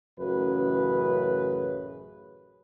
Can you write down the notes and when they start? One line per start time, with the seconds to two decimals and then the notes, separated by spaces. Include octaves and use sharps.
0.20 A1 F#2 C#3 B4